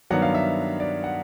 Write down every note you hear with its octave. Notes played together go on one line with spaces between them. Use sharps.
G2 D#3 F#3 B3 D4 F#5
F5
E5
D5
F#5